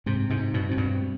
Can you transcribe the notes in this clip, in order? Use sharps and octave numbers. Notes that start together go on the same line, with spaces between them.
G#2 C3 C4
G#2 C3
D#4
G2 B2
C3 C4
G2 B2
G3